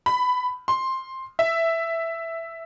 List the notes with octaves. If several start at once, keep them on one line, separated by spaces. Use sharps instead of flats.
B5
C6
E5